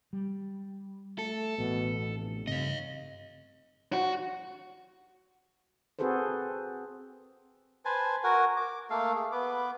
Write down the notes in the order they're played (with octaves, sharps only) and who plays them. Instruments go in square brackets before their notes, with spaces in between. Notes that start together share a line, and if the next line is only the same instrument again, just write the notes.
[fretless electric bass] G3
[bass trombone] A3 [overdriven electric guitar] A4
[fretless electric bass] A1 A3 [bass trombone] B2
[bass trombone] F1
[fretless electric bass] G2 C#3 C4 [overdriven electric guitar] D#5 F5
[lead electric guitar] F#4
[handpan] C4 F#4 G#4 A4 B4 C5
[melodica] B4 C5 G#5 A5
F#4 A#4 F#5 G#5
D6
A3 A#3 A4 F5
G#4
B3 B4 D6